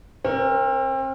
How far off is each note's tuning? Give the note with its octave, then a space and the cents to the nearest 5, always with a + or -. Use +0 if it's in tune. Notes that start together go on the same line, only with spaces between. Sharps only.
C4 +35 A#4 +0